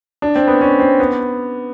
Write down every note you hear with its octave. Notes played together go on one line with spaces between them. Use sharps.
D4
C4
B3
C#4
C4
B3